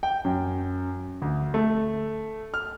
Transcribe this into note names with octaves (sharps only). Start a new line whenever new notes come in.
G5
F#2
D2
A3
F6